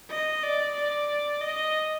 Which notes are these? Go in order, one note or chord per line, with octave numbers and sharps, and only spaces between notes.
D#5
D5
D5
D#5